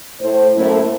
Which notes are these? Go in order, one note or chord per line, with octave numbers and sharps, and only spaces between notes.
A2 C5
F#2 A2 A3 A#3 E4 C5